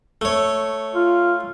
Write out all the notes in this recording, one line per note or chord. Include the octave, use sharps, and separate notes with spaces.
A3 C#5
F4